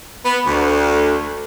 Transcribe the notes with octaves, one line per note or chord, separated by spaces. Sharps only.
B3
D2